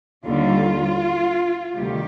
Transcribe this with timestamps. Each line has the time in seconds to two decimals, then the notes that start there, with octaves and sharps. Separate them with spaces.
0.24 D#2 D3 G3 F4
1.75 D2 C3 D#3 G3 G4